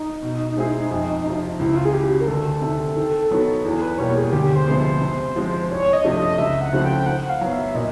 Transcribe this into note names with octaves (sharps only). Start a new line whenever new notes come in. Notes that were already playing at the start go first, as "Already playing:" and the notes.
Already playing: D#4
B2
G#3 C4 E4 G#4
F2
C3 F3
C#2 E4
F4
G#4
C#3 E3 G4
F#4
A#4
D2 A4
C3 D#3
D#3
F#3 B3 D#4 F#4
E2 G#4
B4
B2 G3 A#3 C#5
G#4
D2 G4
C5
C3 F3 G#3 B3
C5
C3
F3 G#3 C4
C2 C#5
D#5
C3 F3 A3 D4
D#5
C#2 E5
F#5
C#3 F3 A3 C4
G5
D#3 F#5
F5
F#3 B3
E5
A#2 D#5